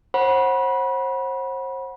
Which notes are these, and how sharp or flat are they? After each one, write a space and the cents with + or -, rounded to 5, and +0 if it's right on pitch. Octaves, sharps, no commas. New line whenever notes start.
C5 +35 F#5 +0 B5 -25